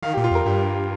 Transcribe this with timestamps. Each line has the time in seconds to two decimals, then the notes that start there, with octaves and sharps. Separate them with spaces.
0.03 D#3 F5
0.14 G4
0.17 A#2
0.24 F4
0.31 F2 A#4
0.46 G2 G4